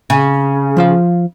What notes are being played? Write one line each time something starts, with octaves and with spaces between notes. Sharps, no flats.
C#3
F3 F4 F5